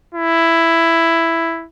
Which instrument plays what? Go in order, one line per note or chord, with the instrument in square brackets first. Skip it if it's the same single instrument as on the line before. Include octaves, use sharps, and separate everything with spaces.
[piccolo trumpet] E4